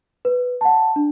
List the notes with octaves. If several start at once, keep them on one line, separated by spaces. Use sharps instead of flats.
B4
F#5 A5
D4